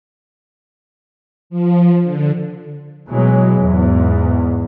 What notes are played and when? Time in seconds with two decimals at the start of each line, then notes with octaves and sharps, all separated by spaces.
1.50 F3
2.02 D3
3.09 B2 E3 F#3 G#3
3.61 E2 G#2